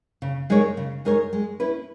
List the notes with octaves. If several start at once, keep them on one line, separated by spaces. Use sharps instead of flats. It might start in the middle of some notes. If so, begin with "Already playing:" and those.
C#3
G#3 D#4 A#4 C#5
C#3
G#3 D#4 A#4 C#5
G#3
C#4 E4 B4